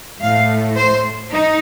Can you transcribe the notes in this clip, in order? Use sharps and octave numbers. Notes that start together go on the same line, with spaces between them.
A2 A3 F5
C5
D#4